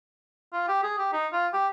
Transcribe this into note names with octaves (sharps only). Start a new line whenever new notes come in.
F4
G4
G#4
G4
D#4
F4
G4